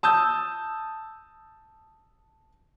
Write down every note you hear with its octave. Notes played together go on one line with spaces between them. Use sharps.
A5 D#6 E6 G6